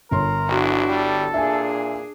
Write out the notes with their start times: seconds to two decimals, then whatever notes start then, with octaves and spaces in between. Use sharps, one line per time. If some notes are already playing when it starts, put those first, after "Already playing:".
0.11 G1 A#4 C#5 C6
0.49 B1 D4 E4 F#4
0.88 G3 A4
1.34 A#2 D4 G#4 E5 G#5